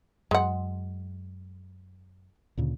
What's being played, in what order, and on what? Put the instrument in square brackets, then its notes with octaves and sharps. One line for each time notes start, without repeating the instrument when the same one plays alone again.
[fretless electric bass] F#2 [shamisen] G#3 F#5
[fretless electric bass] D2 A#2 C#3